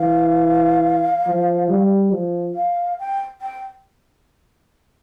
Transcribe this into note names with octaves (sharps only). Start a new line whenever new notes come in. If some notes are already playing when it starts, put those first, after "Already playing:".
Already playing: E3 F5
F3
G3
F3
F5
G5
G5